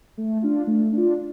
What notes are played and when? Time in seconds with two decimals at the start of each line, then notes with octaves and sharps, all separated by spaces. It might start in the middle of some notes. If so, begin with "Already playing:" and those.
0.18 A3
0.42 D4 F4
0.67 A3
0.93 D4 F4